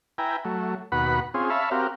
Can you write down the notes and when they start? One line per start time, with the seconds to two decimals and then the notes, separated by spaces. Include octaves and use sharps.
0.18 E4 B4 G5 G#5 A#5
0.45 F#3 A3
0.92 D#2 B2 F#4 B4 F#5 B5
1.34 C4 C#4 F4 G#4
1.50 C#5 E5 F5 A5 B5
1.71 C4 F#4 G4 A#4 F5